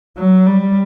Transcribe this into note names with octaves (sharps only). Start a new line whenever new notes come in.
F#3
G3